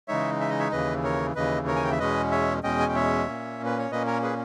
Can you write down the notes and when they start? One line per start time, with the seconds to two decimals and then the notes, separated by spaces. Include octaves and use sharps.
0.08 C#3 E3 G#3 D#4 C#5 E5
0.41 E5
0.50 D#5
0.59 C#5 E5
0.71 D#2 C#3 E3 B4 D#5
1.04 A#4 C#5
1.35 D#2 C#3 E3 B4 D#5
1.67 A#4 C#5
1.76 G#5
1.84 G5
1.91 E5
1.99 E2 B2 G#3 C#4 B4 D#5
2.31 C#5 E5
2.63 E2 B2 G#3 C#4 D#5 G5
2.80 G#5
2.88 G5
2.95 C#5 E5
3.27 A#2 A#3 C#4
3.65 B4
3.79 C#5
3.91 A#2 A#3 C#4 B4 D#5
4.07 A#4 C#5
4.23 G#4 B4